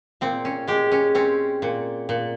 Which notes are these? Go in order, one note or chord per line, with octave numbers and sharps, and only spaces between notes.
A#2 C4
C#4
G#3 G4
C#4
C4 C#4
A#2
A#2